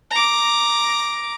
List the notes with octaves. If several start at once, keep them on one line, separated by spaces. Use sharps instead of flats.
A#5 D6